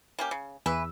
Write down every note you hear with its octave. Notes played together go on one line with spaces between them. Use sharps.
A#3 C#4 G4
C#3
E2 E3 B4 E6